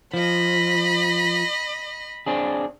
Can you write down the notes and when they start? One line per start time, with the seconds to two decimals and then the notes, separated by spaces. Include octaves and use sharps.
0.14 F3 D#5 B5
2.26 C4 D4 G#4